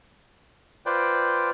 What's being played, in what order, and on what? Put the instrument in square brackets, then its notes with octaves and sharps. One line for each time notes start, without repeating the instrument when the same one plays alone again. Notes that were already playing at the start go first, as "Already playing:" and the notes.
[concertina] F4 B4 C5 D5 G5